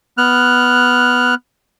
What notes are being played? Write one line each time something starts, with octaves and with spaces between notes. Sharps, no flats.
B3 F6 F#6